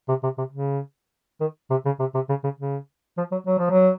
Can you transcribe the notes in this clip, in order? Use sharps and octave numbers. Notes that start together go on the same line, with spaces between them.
C3
C3
C3
C#3
D#3
C3
C#3
C3
C3
C#3
C#3
C#3
F3
F#3
F#3
F3
F#3